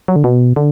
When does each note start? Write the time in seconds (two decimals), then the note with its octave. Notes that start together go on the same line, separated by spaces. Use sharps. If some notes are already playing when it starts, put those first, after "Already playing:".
0.08 F#3
0.16 D3
0.24 B2
0.56 D3